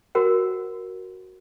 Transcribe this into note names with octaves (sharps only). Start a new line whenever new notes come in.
F#4 A#4 C5 F#5